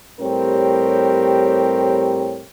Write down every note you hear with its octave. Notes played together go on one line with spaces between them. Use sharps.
A2 G3 C4 G4 A#4 C#5